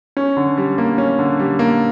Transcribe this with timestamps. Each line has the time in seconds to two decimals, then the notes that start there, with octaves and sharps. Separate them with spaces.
0.17 C#4
0.37 D3
0.57 G3
0.78 A#3
0.98 C#4
1.19 D3
1.39 G3
1.59 A#3